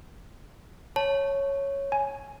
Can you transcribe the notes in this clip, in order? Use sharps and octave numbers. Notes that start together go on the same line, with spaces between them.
C#5 A5
G#5